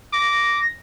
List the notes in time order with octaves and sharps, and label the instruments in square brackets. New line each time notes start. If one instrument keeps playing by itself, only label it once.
[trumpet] D6 [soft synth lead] A#6